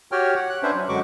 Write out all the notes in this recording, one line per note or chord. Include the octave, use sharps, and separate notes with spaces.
F#4 G4 C#5 G5 F6
F#5
F#6
C#4 D4 B4 C5 E5
F#3
F#2 D3 G#3 F#4 C#6 D6